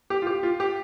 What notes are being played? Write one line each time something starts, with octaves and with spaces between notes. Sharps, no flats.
G4
F4
G4
F4
G4